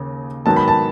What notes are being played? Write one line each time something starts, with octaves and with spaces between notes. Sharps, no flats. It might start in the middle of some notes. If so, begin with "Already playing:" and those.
Already playing: D#2 C#3
G#2 D#3 F#3 B3 A5
B5
A5